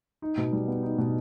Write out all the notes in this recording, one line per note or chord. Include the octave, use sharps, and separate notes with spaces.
D#4
B2
G3
B3
D#4
B2